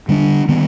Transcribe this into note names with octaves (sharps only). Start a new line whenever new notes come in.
D3 G3 B3 D4
D#3 G3 B3